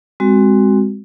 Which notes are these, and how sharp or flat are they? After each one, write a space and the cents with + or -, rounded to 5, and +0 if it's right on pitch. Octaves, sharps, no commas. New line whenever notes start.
G#3 -25 C4 +0 F#4 +10